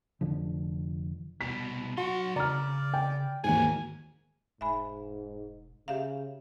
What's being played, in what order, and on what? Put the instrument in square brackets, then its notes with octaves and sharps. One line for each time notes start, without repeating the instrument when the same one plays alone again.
[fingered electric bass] F1 D3 F3
[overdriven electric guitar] C2 B2 [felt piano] B6
[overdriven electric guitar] F#3 C6 [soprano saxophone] F#4
[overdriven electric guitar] C#3 [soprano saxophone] D5 [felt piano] A#5 F6
[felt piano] G5
[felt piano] D#2 G#2 [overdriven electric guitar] F#4 G#4 [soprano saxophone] G#5
[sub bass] E1 [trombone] G#2 [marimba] E5 G#5 B5
[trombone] C#3 [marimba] G4 E5 F5